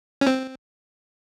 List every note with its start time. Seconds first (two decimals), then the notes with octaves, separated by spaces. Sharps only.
0.21 C#4
0.27 C4